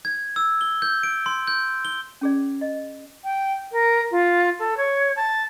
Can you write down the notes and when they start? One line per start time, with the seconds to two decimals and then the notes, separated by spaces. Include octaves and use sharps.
0.05 G#6
0.36 E6
0.61 G7
0.82 G6
1.03 D7
1.26 C6
1.47 G6
1.85 G7
2.21 C#4 G#4 D5
2.61 D#5
3.24 G5
3.72 A#4
4.11 F4
4.59 A4
4.77 C#5
5.16 A5